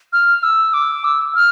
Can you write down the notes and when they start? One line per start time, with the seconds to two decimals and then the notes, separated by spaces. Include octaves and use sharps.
0.13 F6
0.43 E6
0.74 D6
1.04 E6
1.35 F6